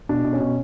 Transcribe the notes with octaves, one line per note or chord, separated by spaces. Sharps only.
B2 D4
B2
C#4
B2